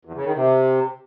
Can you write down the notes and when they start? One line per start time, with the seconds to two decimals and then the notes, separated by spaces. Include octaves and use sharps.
0.05 E2
0.15 C#3
0.25 D#3
0.35 C3